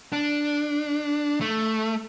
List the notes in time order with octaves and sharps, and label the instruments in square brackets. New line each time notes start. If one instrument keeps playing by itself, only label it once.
[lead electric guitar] D4
A3